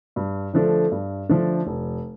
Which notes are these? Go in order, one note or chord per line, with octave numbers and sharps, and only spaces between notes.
G2
D3 F3 A3 D4
G2
D3 F3 A3 D4
F1